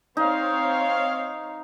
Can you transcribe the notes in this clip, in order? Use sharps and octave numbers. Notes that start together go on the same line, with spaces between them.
C4 D#4 C#5 F5